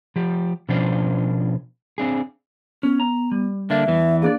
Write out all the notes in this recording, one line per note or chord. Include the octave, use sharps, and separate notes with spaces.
F3 G4
B2 F3 C#4 D4 C5
C4 D4 G#4
B3 C#4
A#5
G3
D3 A#3 D4 E5
E2 E3
A#3 D4 G#4 D5